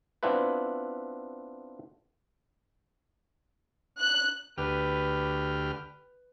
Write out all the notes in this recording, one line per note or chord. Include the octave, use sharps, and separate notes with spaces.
B3 C4 D4 E4 F4 B4
F#6
D2 G4 B4 F6